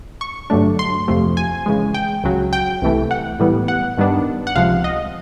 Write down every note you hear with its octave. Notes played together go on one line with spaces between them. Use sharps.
C#6
G2 D3 F#3 A3 D4
C6
F2 C3 F3 A3
G#5
C#3 E3 G#3
G5
C#2 C#3 F#3
G5
C2 C3 E3 A3
F#5
A2 E3 G3 B3
F#5
G2 D#3 G3 B3 D4
F#5
C#2 C3 F3 F5
D#5